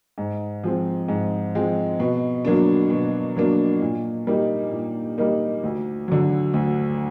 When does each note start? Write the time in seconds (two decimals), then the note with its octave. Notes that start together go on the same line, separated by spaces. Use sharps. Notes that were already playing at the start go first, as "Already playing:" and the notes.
0.18 G#2
0.64 F3 G#3 C4
1.08 G#2
1.55 F3 G#3 C4
2.00 B2
2.45 F#3 A#3 D4
2.90 B2
3.36 F#3 A#3 D4
3.82 A#2
4.27 G3 A#3 D#4
4.72 A#2
5.18 G3 A#3 D#4
5.63 D2
6.08 D3 F#3
6.54 D2